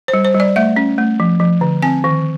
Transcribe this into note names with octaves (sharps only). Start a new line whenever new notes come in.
C5
G3
C5
G3
D5
A3 E5
C#4
A3
F3
F3
D3
C4 G#5
D#3